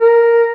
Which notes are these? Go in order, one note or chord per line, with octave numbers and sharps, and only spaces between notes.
A#4